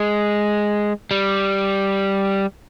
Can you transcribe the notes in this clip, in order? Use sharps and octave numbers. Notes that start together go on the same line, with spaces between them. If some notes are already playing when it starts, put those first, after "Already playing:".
Already playing: G#3
G3